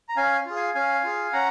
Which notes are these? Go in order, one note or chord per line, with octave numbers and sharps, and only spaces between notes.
A#5
C#4 F5 G#5
F4 G#4
F5 G#5
C#4 F5 G#5
F4 G#4
C#4 F#5 A#5